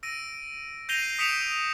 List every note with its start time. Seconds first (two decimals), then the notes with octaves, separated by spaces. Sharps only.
0.03 E6 A#6 D7 D#7
0.89 G6 A#6 C7 D#7 F7 G7
1.19 D#6 B6 C#7 D7 E7 F7